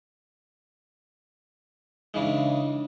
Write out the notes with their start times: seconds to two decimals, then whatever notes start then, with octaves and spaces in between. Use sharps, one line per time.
2.14 C#3 E3 G#3 D4 D#4